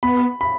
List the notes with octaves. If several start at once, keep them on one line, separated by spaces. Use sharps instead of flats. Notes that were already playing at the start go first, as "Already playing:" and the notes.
B3 B5
B5